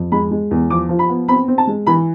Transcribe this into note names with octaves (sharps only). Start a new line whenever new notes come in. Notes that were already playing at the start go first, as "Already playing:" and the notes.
Already playing: F2
G#3 B5
G#3
E2
F3 D6
F3
B5
B3
C4 B5
C4
A5
G#3
E3 B5